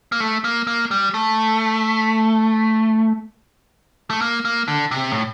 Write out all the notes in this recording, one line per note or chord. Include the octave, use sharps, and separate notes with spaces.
A#3
A3
A#3
A#3
G3
A3
A3
A#3
A#3
D3
C3
A2